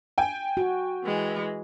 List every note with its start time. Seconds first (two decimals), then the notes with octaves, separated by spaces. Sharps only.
0.18 G5 G#5
0.57 F#4
1.03 E3 G#3